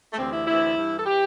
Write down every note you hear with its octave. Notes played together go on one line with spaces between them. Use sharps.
A3
D2 C3 E3 C4
E4
D2 C3 E3 E4
G2 E3
A4
E3 G4